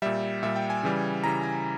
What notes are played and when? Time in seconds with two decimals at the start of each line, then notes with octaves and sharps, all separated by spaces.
0.02 A#2 G3 E5
0.43 A#2 G3 E5
0.56 G5
0.70 G#5
0.83 C#3 E3 G3
1.24 C#3 E3 G3 A#5
1.43 G#5